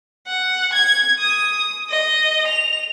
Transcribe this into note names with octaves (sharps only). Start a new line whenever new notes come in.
F#5
G#6
D#6
D#5
F7